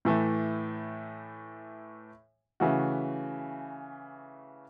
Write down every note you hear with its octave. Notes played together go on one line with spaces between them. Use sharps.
A2 E3 A3
C#3 E3 A3 F#4